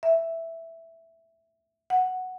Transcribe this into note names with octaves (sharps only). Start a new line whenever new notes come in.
E5
F#5